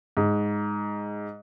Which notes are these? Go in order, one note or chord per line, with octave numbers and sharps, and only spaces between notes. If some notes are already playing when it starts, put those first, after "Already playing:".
G#2